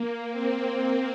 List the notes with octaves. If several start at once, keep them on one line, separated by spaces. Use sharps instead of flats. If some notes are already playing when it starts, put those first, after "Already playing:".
Already playing: A#3
C4